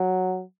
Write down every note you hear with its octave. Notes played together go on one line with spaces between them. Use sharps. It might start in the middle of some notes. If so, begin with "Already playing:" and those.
Already playing: F#3